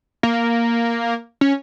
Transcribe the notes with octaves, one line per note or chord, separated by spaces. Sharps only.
A#3
C#4